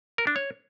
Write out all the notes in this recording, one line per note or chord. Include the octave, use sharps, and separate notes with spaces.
A#4
D4
C#5